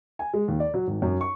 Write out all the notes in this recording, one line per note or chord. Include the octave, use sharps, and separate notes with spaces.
G#5
G#3
D#2
D5
F#3
G#1
F#2
C#6